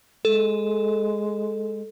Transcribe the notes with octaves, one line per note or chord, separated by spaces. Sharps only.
G#3 A4